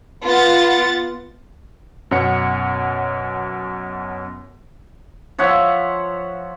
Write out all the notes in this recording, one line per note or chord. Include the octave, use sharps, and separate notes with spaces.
B3 F4 F#5 A6
F#2 B2 C#5 F#5 C#7
F3 C#5 E5 F#5